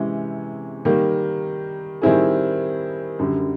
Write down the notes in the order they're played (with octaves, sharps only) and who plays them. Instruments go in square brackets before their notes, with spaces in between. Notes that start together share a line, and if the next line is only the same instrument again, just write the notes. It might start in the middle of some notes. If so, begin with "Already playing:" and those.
Already playing: [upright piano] C3 E3 G#3 C#4 E4
D#3 G3 A#3
D#3 G3 C4 E4 G#4
F#2 D3 G3